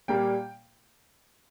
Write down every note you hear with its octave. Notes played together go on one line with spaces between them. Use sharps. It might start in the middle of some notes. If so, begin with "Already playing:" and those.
A#2 G3 A#3 G5